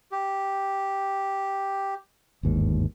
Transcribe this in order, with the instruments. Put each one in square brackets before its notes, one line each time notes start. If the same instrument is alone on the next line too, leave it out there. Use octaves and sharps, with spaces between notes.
[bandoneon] G4
[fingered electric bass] G1 D#2 G#2